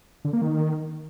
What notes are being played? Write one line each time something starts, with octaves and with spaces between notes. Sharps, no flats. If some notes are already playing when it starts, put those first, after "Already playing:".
D3
A#3
D#3